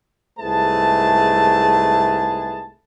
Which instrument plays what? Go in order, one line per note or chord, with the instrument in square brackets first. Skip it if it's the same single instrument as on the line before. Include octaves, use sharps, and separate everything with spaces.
[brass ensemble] C2 G#2 A3 G#4 B4 A5